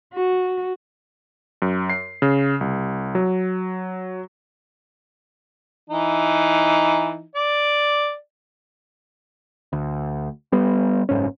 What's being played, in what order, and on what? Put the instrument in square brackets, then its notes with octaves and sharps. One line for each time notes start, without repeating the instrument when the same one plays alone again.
[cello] F#4
[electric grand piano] F#2
C7
C#3
C2
F#3
[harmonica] E3 D#4
D5
[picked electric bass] D2
G3 B3
F#1 G#2 C#4